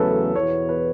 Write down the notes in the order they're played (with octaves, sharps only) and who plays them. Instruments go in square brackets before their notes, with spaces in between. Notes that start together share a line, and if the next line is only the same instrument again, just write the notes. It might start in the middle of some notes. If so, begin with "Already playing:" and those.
Already playing: [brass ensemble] E2 C#3 F#3 A3 C#4 [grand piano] A4 B4
[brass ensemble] E2 B2 B3 E4 [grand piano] C#5
[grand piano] B4